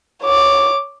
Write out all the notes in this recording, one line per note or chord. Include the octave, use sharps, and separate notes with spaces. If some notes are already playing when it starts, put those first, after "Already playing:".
C#5 D6